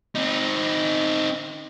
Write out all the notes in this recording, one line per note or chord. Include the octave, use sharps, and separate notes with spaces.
C4 D#4